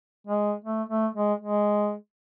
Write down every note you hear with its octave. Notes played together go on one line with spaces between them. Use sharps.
G#3
A3
A3
G#3
G#3